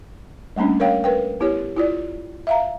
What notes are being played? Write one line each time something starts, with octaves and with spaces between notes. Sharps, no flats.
G3 A3 A#3 C#4 D4
A#4 C#5 F5 G5
A#4 B4 G5
B3 E4 G4 C#5
E4 F4 D5
E5 F5 A#5